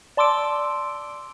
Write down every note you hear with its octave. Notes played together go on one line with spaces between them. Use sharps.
D5 A5 C6 D6 E6 D7